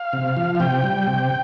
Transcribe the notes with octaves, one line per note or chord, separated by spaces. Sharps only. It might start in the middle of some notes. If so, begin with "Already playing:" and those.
Already playing: F5
C3
F3
F5
C3 G5
G3
C3